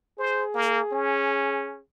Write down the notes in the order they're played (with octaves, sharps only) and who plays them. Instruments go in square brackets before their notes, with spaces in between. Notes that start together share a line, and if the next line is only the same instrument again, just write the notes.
[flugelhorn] G#4 [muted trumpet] C5
[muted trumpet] A#3
C#4